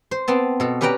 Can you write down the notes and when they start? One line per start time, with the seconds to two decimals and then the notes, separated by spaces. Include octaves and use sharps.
0.11 C5
0.28 B3 C4 A5
0.60 B2 A4
0.81 C#4 G4 B4 D5 G5 A#5